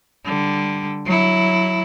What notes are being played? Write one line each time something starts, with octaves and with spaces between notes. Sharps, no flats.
D3 G3
F#3 E4